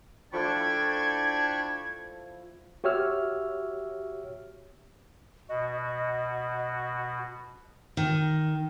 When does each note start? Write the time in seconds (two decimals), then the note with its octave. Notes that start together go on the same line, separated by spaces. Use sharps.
0.33 F3 A3 D4 E4 G5 B5 C#6 G#6
2.84 F#4 G4 C#5 E5 E6 F6
5.49 B2 F#4 D#5
5.81 D#5
7.97 D#3